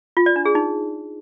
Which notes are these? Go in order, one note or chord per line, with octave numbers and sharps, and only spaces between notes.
F4
D5
D4
G#4
D#4